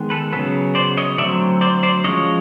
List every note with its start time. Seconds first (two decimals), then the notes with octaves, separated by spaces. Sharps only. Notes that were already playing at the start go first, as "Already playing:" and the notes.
Already playing: D#3 G#3 B3
0.10 A4 B4
0.33 C#3 F#3 B3 A4 B4
0.75 C5 D5
0.97 C#5 D#5
1.18 D3 F#3 A3 C4 D5 E5
1.61 C5 D5
1.83 C5 D5
2.04 F3 G#3 C#4 C#5 D#5